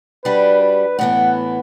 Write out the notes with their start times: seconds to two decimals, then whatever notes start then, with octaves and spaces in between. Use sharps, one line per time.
0.24 G3 D4 F#4 B4
0.61 B4
0.99 A2 E3 B3 F#5